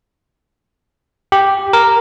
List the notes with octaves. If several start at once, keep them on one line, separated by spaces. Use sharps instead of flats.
G4
A#4